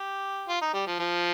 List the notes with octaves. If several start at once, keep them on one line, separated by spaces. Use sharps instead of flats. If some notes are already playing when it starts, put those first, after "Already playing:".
Already playing: G4
F4
D#4
G3
F3
F3